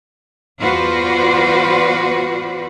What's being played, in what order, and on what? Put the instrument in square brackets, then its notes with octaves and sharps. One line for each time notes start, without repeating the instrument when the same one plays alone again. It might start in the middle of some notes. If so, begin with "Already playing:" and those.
[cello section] E2 F4 F#4 B4 C5 D5